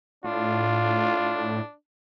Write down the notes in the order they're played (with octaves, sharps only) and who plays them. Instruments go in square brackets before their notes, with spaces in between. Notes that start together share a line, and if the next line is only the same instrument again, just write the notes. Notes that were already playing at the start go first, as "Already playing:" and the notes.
[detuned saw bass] A2 [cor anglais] D4 [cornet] F4